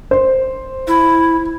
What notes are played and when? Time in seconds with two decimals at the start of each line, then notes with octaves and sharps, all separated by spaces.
0.11 C5
0.88 E4